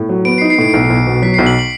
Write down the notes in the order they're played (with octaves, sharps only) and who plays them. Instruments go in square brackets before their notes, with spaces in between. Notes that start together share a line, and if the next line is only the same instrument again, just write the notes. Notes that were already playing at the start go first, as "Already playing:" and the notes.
Already playing: [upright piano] A2
F#3
[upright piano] B3 [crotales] D7
[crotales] C7
[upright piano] D#4
[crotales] C7
[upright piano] A2 [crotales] D7
[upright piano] B1 [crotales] C7
[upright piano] B1
B2
[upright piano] F#3 [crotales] B6
[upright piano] B1 [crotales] C7
[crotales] F#7
F#7